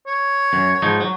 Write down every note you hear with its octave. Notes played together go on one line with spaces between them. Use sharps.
C#5
F#2
G#2 F3 D#4
F#3